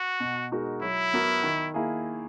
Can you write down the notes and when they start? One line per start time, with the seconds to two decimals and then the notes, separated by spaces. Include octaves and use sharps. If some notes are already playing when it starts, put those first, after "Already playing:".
Already playing: F#4
0.20 B2
0.52 G#3 D#4 F#4 A#4
0.82 F#3 E4
1.13 B3 F#4 A#4
1.43 D#3
1.74 A#3 E4 G#4